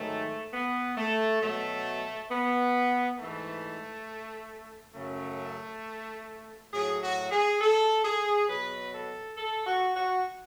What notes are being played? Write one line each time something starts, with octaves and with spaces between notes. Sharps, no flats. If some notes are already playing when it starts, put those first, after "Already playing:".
Already playing: G#2 D#3 F#3 A3
B3
A3
B2 F#3 A3
B3
G#2 E3 A3
F#2 C#3 F#3 A3
A2 F#3 G#4
F#4
G#4
A4
G#4
B2 F#3 B4
A4
A4
F#4
F#4